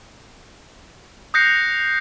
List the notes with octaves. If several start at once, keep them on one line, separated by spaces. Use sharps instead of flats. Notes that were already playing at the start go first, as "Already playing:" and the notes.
D#6 F#6 G6 A#6 C7 C#7